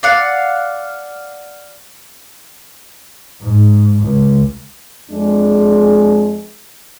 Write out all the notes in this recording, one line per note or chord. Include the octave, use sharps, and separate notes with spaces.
D5 F5 F#5
G#2
C#2
F2 G#3 D4 G#4